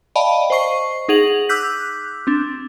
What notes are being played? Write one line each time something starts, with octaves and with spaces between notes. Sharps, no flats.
D5 D#5 F5 G5 A5 B5
C5 D#5 C#6 C7
D#4 G#4 F#5 F7 F#7
D6 E6 F#6 G6 B6
C4 D4